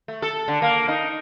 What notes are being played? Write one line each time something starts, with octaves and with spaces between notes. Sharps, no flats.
A3
A4
D3
A#3
D#4